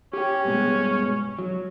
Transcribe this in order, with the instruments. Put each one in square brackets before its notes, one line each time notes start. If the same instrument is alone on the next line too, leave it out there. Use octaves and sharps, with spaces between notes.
[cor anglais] C#4 [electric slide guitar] G4 G5
[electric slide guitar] G2 B2 G#3
F#3